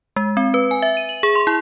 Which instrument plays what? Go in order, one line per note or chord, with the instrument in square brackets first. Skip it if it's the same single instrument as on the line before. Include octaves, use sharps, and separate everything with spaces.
[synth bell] G#3
C4
B4
G#5
E5
D#7
F#7
G#4
C6
E4